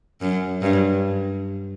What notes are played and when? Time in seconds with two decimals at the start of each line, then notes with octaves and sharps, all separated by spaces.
0.21 F#2
0.62 G2